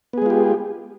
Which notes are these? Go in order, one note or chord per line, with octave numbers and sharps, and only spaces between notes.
G#3 B3 F4 G4 G#4